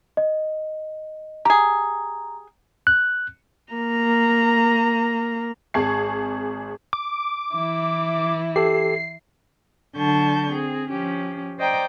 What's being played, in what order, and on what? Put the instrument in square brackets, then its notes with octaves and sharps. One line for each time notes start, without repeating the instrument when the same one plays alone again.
[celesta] D#5
[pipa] G4 G#4 [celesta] A#5
[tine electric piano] F#6
[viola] A#3 A#5
[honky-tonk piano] G#1 G#4 A5 C#6 G#6 C7
[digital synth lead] D6
[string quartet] E3 E4
[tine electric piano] G4 A4 [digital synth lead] C7
[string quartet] D3 F#3 A5 C#6 G6
C4 G#4
F3 C#4 G4
C5 D5 D#5 G5 A#5 D6